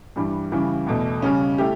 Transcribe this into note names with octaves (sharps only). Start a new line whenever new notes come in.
G2 E3 G3
C#3 E3 G3
E2 B2 A3
C#3 G3 C#4
A3 E4 G4